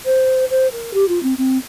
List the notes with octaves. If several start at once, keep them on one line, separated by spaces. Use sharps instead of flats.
C5
C5
A#4
G4
F4
C4
C4